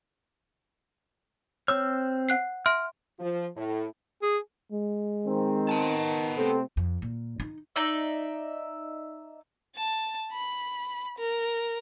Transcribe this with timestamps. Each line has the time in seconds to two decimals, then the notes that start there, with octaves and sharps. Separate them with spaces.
1.68 C4 C#5 E6 F6
2.29 F#5 F#6 C7
2.66 E5 C6 F6 D7
3.19 F3
3.56 A2
4.22 G#4
4.72 G#3
5.27 D#3 C4
5.69 B3 A5
6.37 C3 A3 C4 A4
6.77 F2
7.02 A#2
7.40 D#4
7.76 D#4 D5 E5
9.75 A5
10.32 B5
11.18 A#4